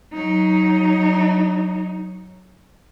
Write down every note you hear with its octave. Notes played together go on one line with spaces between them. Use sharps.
F#3 D#4